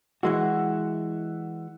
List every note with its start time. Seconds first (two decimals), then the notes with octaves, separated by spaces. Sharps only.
0.23 E3 G#3 F#4 E5 F#5